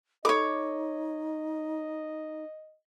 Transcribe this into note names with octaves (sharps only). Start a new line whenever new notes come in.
D#4 A4 C#5 D#5 B5 D6